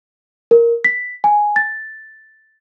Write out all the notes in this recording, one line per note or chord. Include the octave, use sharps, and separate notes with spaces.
A#4
B6
G#5
A6